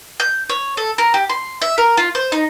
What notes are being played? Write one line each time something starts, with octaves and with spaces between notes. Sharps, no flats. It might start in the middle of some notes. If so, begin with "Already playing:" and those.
G6
C#5
A4
A#4
G4
C6
E5
A#4
F4
C5
D#4